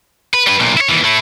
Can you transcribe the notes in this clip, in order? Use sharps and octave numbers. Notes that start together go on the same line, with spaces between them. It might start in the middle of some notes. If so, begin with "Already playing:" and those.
B4
G3 B4
B1 A#2
E4 C#5
D#2 E3
A3 E4